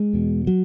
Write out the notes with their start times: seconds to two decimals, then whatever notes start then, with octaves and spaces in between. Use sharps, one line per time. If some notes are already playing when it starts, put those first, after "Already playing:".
Already playing: G#3
0.13 E2 B2
0.47 F#3